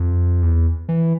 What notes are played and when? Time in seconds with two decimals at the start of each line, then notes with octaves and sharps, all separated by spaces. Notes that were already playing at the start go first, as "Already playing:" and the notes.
Already playing: F2
0.42 E2
0.89 E3